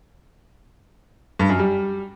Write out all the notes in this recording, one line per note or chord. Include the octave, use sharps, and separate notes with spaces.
G2
F#2
G3